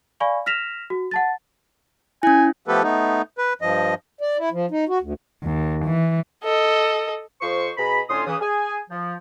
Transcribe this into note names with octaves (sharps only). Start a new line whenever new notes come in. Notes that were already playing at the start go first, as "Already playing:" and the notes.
D5 F5 G#5 B5 C#6
F6 A#6 B6 E7 F7
F#4
F#5 A5 A6
C#4 E4 G#5
F3 A3 B3 G4 A4 B4
A3 B3 D#4
B4
G2 F3 D#5
D5
E4
F3
D#4
F#4
D2
D#2
E3
A4 D#5
F2 F3 C5 C#6
B2 G#4 A#5 B5
A2 D3 C#4 F4 C6 D#6
C#3 E3 D#6
G#4 G#5
F3